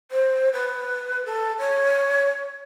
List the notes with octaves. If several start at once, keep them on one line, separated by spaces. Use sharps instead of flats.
C5
B4
A4
C#5